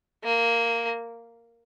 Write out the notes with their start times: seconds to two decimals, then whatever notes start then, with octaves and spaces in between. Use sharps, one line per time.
0.24 A#3